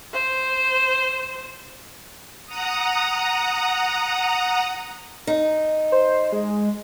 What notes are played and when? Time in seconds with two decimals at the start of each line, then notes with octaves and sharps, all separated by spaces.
0.13 C5
2.46 F#5 A#5 D#6
5.27 D#4
5.92 C5
6.32 G#3